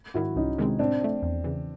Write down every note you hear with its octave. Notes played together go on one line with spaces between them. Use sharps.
G#2 D#3 F#3 E4 F#4
C2 C#4 D#4
C3 D#3 G#3 C4
A2 C4 D4
F3 A3
E2
C#3 E3